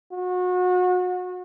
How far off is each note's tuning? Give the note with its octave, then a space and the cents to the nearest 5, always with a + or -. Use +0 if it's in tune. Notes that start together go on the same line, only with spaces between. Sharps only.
F#4 -30